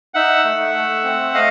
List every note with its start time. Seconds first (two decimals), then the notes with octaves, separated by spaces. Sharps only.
0.14 D#4 E5 F#5
0.45 A3
0.75 A3
1.04 C4
1.34 A3 D#5 F5